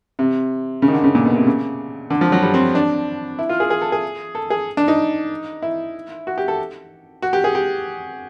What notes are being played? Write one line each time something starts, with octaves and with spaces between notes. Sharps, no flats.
C3
C#3
D#3
D3
C#3
A#2
B2
C3
C#3
D3
F3
F#3
G3
C4
D4
E4
F4
G#4
G#4
A4
G#4
A4
G#4
D4
D#4
E4
F#4
G4
A4
F#4
G4
G#4
G4